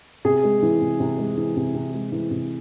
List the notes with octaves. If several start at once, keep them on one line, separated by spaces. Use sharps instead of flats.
C3 G#4
G#3
E3
C3
C3
G#3
E3
C3
C3
G#3
E3
C3